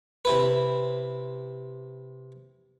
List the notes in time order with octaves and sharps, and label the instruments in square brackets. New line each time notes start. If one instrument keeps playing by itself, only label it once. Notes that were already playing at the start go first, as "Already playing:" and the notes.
[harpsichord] C3 E4 B4